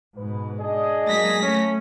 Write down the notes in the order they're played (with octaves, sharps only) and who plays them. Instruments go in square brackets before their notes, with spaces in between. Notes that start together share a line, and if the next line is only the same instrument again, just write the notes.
[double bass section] G#2 B2 [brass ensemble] B4
[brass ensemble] D4 D5 D#5 [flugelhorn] G#4
[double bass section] F#3 G#3 A#3 [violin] A#6 B6
[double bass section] A3 [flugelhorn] C#4